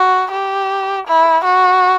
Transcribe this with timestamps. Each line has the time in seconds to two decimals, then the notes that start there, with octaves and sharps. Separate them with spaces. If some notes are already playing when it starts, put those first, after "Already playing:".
Already playing: F#4
0.31 G4
1.07 E4
1.45 F#4